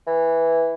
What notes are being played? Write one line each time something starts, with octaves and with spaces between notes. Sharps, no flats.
E3